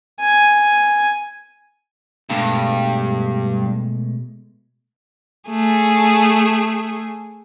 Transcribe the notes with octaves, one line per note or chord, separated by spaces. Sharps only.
G#5
G2 B2 G#3 A3
A3 G#4